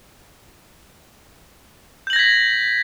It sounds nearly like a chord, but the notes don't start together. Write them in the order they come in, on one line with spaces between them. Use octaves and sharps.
G6 F#7 A#6 G#6 B6